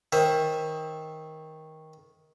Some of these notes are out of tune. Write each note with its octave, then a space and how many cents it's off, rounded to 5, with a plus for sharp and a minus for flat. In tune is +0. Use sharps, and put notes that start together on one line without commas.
D#3 +15 C5 +30 E5 +5